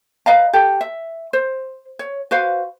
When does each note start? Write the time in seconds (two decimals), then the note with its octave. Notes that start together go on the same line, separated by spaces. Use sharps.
0.26 B4 D#5 F5 A#5
0.53 G4 A4
0.81 E5
1.33 C5
1.99 C#5
2.31 F#4 B4 C5 F5